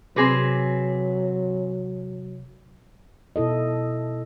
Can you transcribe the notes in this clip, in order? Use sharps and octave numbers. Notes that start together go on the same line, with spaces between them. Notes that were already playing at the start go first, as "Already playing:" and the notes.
C3 F#3 C4 G#4 B4 D6 A#6
B2 E4 A4 D#5